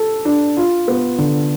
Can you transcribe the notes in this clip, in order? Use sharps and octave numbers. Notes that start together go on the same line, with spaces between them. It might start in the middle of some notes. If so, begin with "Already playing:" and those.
Already playing: A4
D4
F4
B3
D3